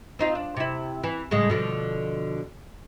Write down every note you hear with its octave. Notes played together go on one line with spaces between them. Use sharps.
C4 D#4 F4
D4
C3 E4
E3
A2 C#3 G#3
B2 D3 F3